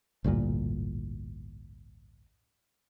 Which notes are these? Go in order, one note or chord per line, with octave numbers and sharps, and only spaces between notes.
A1 D2 G2 A#2